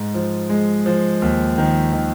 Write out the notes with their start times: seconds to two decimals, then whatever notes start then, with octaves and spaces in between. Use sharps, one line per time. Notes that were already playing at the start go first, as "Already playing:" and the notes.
Already playing: G#2
0.14 F3
0.49 G#3
0.86 F3
1.22 D#2
1.58 D#3
1.93 D#3